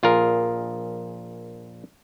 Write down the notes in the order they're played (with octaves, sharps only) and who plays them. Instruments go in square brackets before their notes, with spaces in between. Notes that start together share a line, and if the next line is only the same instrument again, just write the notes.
[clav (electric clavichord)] A#1 F4 G#4 A#4